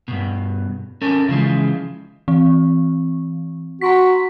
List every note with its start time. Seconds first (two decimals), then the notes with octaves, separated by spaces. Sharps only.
0.08 G2 B2
1.02 C#4 A4 A#4
1.29 C#3 E3 F3 G#3
2.28 E3 C4
3.81 F#4 A#5 C6 B6